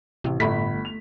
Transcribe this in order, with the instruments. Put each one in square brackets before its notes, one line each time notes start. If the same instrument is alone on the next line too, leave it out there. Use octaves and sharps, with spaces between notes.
[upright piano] A1 [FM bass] C3
[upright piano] G1 B5 B6 [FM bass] A2 [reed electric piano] A3
[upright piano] F7